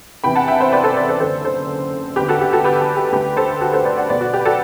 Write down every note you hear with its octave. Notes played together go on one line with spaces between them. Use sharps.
E2 C3 E3 G5 B5
F#5 A5
E5 G5
C5 E5
B4 D5
A4 C5
B4 D5
A4 C5
F#1 F#2 D3 A4 C5
A4 C5
E2 D3 G4 B4
F#4 A4
G4
F#4 A4
G4 B4
G4
G4
D2 D3 G4 B4
A4 C5
F#4 A4
A4 C5
B4 D5
D5 F#5
B1 B2 B4 D5
F#4
G4
B4
F#4 A4